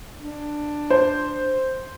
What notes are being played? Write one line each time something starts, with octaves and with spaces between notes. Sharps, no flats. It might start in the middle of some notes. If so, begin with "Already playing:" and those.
D4
C5